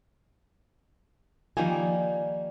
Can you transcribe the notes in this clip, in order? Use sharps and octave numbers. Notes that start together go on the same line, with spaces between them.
D#3 F3 G3 A#3 F4 G#5